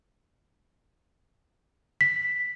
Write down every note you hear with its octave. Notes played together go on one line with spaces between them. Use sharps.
B6